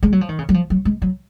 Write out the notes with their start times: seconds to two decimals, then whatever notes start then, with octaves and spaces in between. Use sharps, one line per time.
0.03 G#3
0.12 F#3
0.21 F3
0.29 D#3
0.39 C#3
0.49 F#3
0.54 F3
0.70 F#3
0.85 G#3
1.02 F#3